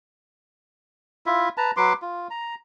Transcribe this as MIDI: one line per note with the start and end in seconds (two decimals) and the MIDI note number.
1.26 1.49 64
1.26 1.49 65
1.26 1.49 76
1.57 1.71 71
1.57 1.71 81
1.57 1.71 82
1.77 1.93 54
1.77 1.93 71
1.77 1.93 84
1.77 1.93 86
2.02 2.28 65
2.30 2.55 82